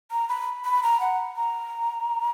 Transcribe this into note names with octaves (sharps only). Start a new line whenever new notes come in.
A#5
B5
B5
A#5
F#5
A#5